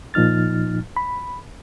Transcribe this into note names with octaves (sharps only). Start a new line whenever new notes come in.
A#2 F3 D#4 F6 A6
B5